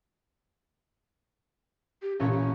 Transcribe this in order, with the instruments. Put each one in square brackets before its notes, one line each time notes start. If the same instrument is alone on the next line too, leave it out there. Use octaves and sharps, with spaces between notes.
[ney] G4
[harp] A1 A#2 C#5 [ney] C#4
[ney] C#4